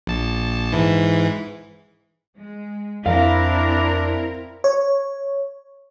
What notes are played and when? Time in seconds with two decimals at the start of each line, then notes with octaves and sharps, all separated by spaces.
0.07 A#1 A5
0.72 G#2 E3
2.37 G#3
3.06 F2 C4 D4 E4 A#4 F5
4.64 C#5